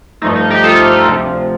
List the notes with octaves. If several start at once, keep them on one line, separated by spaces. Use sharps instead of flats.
G2 F3 A3 D#4
D#4
D#4 G4
F4 A4
D2 C3 F3